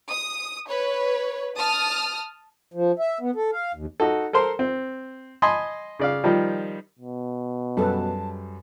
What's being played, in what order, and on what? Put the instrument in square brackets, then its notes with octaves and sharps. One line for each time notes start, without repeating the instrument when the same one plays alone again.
[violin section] D#6
B4 C#5
A5 D#6 F6
[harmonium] F3
E5
B3
A4
F5
D#2
[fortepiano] D#4 F#4 A4
A4 A#4 C5 C6
C4
D#5 G#5 A5 B5 C6
C#3 D5 F5
D#3 F3 G3
[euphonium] B2
[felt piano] F#2 G3 [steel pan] F#4 A4 B4 [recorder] A5